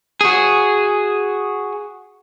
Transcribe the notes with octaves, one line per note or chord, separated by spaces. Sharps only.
F#4 G#4